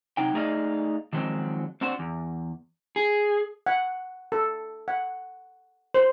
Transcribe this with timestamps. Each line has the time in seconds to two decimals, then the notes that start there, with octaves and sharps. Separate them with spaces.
0.17 C3 F#3 D#4 G5
0.34 A3 D#4 G#4 D5 D#5 F5
1.13 D#3 F3 F#3 G#3 C4
1.81 C4 D4 F#4 C5
1.99 E2
2.96 G#4
3.66 F#5
4.32 A4
4.88 F#5
5.94 C5